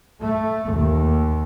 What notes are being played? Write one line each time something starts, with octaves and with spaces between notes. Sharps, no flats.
A3
D#2